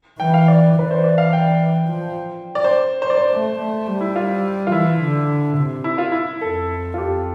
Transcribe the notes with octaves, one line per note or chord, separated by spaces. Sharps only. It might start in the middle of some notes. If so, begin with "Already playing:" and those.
E3 G5
F5
D5
E3 B4
C5
D5
F5
G5
F3
D5
C5
C5
D5
C5
A3
A3
G3
E4
F4
F4
E3 E4
D3
C3
E4
F4
E4
F2 A4
F4
F2 G4